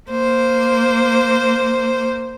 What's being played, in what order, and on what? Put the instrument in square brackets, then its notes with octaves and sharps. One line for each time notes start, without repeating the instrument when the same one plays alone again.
[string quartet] A#3 C5